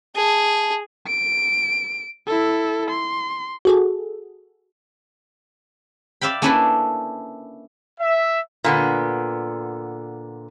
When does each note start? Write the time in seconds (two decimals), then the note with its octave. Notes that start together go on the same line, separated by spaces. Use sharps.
0.16 G#4 A5
1.07 D7
2.28 E4 A4
2.91 C6
3.65 F#4 G#4 A4
6.21 D5 E5 F5 G5 B5
6.42 A#3 C#4 D4 E4 A4 B4
8.00 E5
8.64 A#2 D3 B3